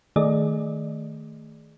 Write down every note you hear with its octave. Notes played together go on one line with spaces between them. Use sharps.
D#3 A3 G#4 D5 D#5